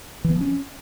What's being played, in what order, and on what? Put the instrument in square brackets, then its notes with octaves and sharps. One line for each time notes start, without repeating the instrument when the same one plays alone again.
[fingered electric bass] E3
B3
F3
C#4